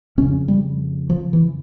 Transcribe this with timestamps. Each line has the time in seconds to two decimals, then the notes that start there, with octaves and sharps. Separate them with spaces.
0.18 F2 C#3 C#4
0.48 G3
1.10 F3
1.33 E3